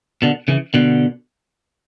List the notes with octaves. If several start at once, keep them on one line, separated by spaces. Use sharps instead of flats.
B2 D3
C#3 E3
B2 D3